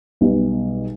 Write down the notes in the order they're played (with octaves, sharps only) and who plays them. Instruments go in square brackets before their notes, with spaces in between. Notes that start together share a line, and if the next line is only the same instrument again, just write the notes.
[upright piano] B1 B2 G3